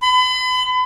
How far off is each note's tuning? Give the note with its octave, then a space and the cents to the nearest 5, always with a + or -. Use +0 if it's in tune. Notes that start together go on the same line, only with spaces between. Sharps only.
B5 +40